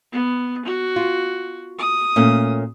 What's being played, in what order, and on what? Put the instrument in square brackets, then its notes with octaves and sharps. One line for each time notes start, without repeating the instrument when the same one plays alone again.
[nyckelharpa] B3
F#4
[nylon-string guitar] F4
[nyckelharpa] D#6
[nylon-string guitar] A#2 A3 C#4